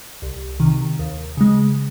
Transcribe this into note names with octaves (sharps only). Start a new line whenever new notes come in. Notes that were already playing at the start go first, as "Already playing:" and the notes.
C2
C3 D#3
D#2
C#3 G#3